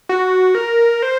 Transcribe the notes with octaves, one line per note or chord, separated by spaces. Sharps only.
F#4
A#4
C5